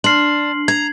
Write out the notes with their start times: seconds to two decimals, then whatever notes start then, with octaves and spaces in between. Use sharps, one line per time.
0.04 D4 C6 F6 C7 F#7
0.68 A#5 G#6